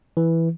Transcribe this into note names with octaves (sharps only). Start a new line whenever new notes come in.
E3